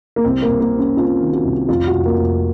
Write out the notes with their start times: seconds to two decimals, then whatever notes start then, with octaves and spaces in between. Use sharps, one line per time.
0.16 A#3
0.24 C2 C4
0.42 A#3
0.49 C2
0.60 A#3
0.73 C3
0.79 C#4
0.97 C3 F4
1.21 D#3
1.33 F#4
1.45 C2
1.69 F1 F4
1.87 F#4
1.93 F1
2.06 A#3
2.17 F1